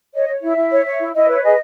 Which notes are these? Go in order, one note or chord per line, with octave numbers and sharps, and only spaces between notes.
C#5 D#5
C#5
E4 E5
E4
C#5
C#5
E4
E4 D#5
B4 C#5
G#4 D#5